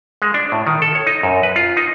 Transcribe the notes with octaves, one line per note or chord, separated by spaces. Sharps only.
G#3
D4
A2
D#3
A4
C#5
D#4
F#2
B4
F4
D#4